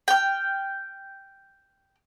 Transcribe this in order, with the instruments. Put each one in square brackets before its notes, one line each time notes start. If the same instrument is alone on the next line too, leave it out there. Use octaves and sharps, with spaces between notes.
[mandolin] G5 F6